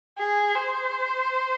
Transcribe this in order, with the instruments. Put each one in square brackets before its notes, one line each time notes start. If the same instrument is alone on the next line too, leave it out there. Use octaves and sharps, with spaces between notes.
[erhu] G#4
C5